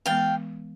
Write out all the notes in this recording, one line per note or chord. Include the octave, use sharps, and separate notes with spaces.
E3 G#3 B3 F5 G5